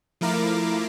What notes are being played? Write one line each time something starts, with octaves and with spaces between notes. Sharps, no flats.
F3 A3 E4 A#4 F5 D6